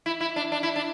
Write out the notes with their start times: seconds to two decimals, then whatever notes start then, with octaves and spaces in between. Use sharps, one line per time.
0.06 E4
0.21 E4
0.36 D4
0.52 D4
0.63 E4
0.76 D4